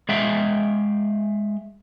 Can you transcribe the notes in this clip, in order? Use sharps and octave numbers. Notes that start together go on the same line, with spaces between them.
G#3 G#4 E5 F5 G5